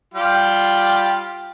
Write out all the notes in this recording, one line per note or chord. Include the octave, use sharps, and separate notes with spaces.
G3 F4 G4